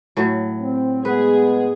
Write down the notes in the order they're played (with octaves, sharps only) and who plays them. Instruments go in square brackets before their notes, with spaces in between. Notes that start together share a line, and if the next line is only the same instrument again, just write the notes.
[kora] A2 F#3
[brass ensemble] C4
[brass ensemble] G#3 B3 [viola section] G#4 [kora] B4